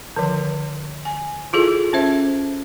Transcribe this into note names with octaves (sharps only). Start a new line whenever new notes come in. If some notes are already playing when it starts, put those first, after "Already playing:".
D3 D#3 F3
G#5
E4 F4 G#4 A4
C#4 C5 E5